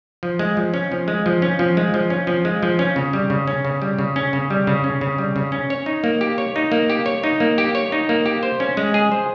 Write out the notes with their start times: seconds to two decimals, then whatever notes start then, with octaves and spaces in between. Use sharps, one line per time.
0.23 F3
0.39 G#3
0.57 F3
0.74 C#4
0.92 F3
1.08 G#3
1.26 F3
1.42 C#4
1.59 F3
1.77 G#3
1.94 F3
2.10 C#4
2.27 F3
2.45 G#3
2.63 F3
2.79 C#4
2.96 C#3
3.13 G3
3.30 C#3
3.47 C#4
3.65 C#3
3.82 G3
3.99 C#3
4.16 C#4
4.33 C#3
4.50 G3
4.67 C#3
4.84 C#4
5.01 C#3
5.18 G3
5.36 C#3
5.52 C#4
5.70 C#5
5.86 D#4
6.04 A#3
6.21 G4
6.38 C#5
6.56 D#4
6.72 A#3
6.90 G4
7.06 C#5
7.24 D#4
7.40 A#3
7.58 G4
7.75 C#5
7.92 D#4
8.09 A#3
8.26 G4
8.43 C5
8.60 C#4
8.77 G#3
8.94 G#4
9.12 C5